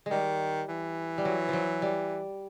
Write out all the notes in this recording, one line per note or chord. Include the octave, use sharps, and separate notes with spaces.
D#3 G3 G#3
E3
G3
F#3
F3 F#3
G3